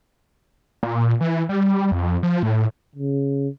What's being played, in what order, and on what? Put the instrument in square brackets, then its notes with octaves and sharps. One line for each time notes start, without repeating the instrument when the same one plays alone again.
[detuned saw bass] A#2
E3
G3
F2
F3
A2
[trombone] C#3